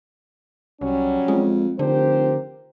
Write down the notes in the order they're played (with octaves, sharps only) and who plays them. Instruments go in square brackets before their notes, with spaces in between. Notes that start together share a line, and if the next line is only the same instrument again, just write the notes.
[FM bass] C2 [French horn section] F#3 G3 C#4
[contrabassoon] F2 [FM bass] G#3
[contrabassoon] F1 [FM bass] D3 [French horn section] G4 A#4 C5